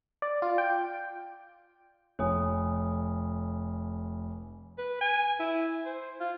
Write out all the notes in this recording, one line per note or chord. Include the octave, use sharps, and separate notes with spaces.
D5
F4
G5
F1 C#5 G#5 D#6
B4
G#5
E4
C5
F4